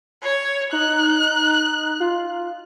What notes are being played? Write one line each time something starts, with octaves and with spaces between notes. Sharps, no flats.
C#5
D#4 F#6
F4